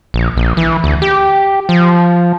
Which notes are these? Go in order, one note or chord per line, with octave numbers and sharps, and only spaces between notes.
A#1
A#1
E3
D2
G4
F3